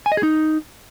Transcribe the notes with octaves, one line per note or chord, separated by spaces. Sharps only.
G#5
D#5
G#4
D#4